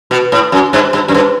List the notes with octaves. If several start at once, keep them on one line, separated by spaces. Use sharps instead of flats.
B2
A2
F#2
G2
G2
F#2
G2